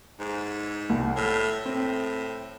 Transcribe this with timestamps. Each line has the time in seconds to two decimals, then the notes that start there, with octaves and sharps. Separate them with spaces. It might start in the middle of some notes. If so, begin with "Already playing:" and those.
0.20 G#2
0.90 C2
1.16 A2 F6
1.65 A2 C4